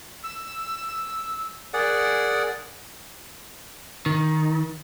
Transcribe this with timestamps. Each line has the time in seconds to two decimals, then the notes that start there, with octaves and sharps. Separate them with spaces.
0.24 E6
1.74 G#4 A#4 D5 F#5
4.06 D#3